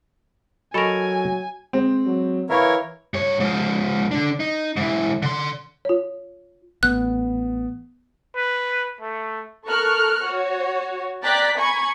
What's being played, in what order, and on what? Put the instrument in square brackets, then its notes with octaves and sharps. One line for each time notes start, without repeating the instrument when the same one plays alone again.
[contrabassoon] F#3 [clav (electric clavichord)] A4 A#4 [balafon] D#5 B5 C#6 [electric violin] G#5
[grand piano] G#3 C4
[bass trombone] F#3
[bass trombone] E3 [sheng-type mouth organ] E4 A#4 C#5 [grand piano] E5 F5 C#6
[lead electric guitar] G2 C#5
G#2 F3
D3 D4
D#4
G#2 E3
D3 C6
[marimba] F4 C#5
[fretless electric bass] A1 [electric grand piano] B3 [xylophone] F#6
[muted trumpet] B4
A3
[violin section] A4 A#4 C#6 F6 F#6
F#4 C#5
D5 G5 A#5 F#6 A6 B6
G#5 A#5 B5 C#6 G#6